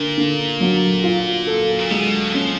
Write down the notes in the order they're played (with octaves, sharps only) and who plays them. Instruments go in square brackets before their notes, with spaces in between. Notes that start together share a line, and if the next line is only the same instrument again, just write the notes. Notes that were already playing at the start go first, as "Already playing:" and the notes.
Already playing: [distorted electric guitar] A#2 [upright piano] D3 A#3
[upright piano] D3
F#3
F4
A4
[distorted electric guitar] A#2
[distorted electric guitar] B2 [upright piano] G#3
[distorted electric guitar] F3 [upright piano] C#4